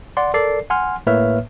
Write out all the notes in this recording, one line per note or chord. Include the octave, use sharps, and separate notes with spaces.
D5 F#5 C6
A4 A#4 D5 C7
F#5 G#5 C6 F6
A2 A#3 B4 C#5 E5 F6